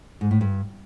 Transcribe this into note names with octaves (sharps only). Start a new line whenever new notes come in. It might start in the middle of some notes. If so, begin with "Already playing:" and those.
G#2
A2
G2